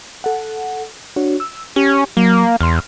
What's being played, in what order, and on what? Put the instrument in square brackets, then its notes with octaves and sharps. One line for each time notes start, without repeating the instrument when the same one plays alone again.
[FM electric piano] A4 F#5
D4 F#4 C#5
E6
[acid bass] C#4 [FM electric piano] G4
[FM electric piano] F#3 [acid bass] A#3
[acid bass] E2 [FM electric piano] C6 F6